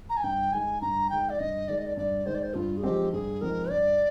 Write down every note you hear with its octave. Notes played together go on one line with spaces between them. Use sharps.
A#5
G#5
G2 G5
D#3 G#3 G#5
G2 A#5
D#3 G#3 G5
D5
G2 D#5
D#3 G#3 D5
D#5
D5
G2 D5
D#3 G#3 C5
D5
C5
G2 F4
G#4
F3 G#3 C4 D#4 G4
G2 G#4
F3 G#3 C4 D#4 A#4
G2 D5